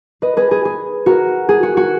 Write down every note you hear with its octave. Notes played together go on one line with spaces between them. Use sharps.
B4 D#5
G#4 B4
G#4
G#4
F#4 A#4
G#4
F#4
F#4